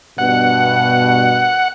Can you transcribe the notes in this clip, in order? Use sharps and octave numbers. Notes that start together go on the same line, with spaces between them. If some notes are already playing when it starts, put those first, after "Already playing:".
G2 B2 F#5